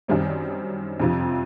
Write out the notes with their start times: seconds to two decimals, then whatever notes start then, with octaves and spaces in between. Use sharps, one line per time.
0.08 F#2 D#3 G3 C4 D#4
1.00 F2 C3 F3